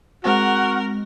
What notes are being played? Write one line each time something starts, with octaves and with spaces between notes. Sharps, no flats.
G#3 C4 F#4 A#4 F#5 A#6